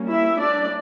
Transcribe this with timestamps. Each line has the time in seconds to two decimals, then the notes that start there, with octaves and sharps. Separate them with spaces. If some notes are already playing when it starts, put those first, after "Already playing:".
Already playing: G3 A#3 C#4
0.09 E4 E5
0.39 D4 D5